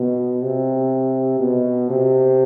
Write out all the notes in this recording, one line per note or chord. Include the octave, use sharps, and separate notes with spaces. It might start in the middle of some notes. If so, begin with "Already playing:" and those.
Already playing: B2
C3
B2
C3